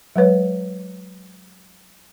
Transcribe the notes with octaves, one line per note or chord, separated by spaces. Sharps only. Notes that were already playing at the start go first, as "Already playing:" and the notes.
F#3 G#3 B4 C#5